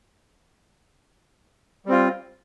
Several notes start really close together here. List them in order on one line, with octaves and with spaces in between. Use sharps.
G3 C4 F4